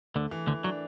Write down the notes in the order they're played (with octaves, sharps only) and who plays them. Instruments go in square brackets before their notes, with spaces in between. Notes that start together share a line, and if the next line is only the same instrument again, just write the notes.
[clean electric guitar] D2 D3 [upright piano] A3
[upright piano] E3
[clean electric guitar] D2 D3 [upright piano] E3
[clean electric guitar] F#3 [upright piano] D4